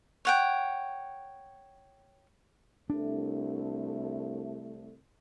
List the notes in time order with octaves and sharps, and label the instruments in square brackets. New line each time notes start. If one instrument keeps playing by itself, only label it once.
[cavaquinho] C#5 F#5 G5
[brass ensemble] C2 A3 [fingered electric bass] D4